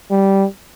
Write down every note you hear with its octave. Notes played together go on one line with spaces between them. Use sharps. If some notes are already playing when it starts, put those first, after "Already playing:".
G3